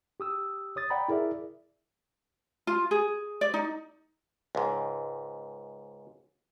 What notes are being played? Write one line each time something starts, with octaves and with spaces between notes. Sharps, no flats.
G4 D#6 E6
C#5 D#6 A6
D5 F#5 G5 A#5 B5
E4 G#4 A#4 D5 E5
F4
G#4
D5
D#4
C#2 G#2